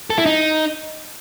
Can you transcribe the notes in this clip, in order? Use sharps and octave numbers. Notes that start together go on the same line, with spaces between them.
A4
E4
D#4